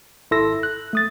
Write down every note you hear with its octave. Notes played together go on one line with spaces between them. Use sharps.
G#1 E4 A4 C6 E6 A#6
F#6
A3 D#6 A6